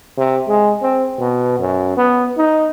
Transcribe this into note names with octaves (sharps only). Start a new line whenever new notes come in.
C3
G#3
C4
B2
F#2
B3
D#4